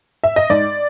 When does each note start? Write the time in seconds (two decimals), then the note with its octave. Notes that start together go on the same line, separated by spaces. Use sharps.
0.24 E5
0.36 D#5
0.50 G#2 D5